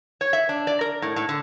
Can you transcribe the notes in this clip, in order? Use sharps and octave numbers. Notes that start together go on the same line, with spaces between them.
C#5
E5
D4
D5
A#4
A2
A2
D3